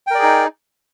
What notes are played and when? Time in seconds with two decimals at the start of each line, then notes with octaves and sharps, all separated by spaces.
0.07 G5
0.11 A#4
0.15 D5
0.19 G#4
0.23 D#4